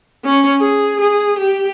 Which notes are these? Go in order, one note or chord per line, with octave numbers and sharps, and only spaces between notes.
C#4
G#4
G#4
G4